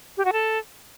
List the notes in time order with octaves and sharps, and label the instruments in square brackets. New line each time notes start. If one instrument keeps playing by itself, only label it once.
[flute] G4
F#4
A4